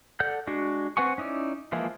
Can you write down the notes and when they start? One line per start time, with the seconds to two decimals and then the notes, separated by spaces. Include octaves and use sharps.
0.20 A4 D5 F#5 G6
0.47 G#3 D4 F#4
0.97 C4 B4 F#5 G#5 C#6
1.18 C#4 D#4 E4 D5
1.72 E3 F3 G#3 A#3 E4